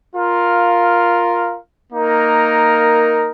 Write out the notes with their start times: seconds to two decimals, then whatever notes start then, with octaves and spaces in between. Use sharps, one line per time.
0.15 F4 A#4 F5
1.92 A#3 D#4 A#4